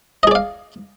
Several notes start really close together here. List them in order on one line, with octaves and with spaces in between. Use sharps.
D#5 G#4 D5 F5